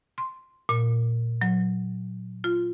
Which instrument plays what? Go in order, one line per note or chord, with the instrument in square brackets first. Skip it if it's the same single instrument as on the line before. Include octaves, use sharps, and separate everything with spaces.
[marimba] C6
A#2
F#3
F4